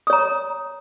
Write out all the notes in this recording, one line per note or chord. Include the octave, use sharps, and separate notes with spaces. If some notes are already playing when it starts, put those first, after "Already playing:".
C#5 A#5 D#6